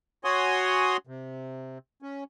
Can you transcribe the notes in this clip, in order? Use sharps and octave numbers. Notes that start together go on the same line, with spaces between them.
F#4 C#5 F#5 G#5 C6 D#6
C3
C#4